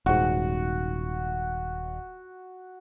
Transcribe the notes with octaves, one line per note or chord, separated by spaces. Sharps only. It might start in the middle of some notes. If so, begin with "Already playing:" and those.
D#1 G#2 F#4